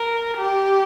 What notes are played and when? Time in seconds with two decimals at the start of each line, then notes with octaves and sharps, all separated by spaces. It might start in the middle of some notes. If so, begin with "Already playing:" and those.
Already playing: A#4
0.38 G4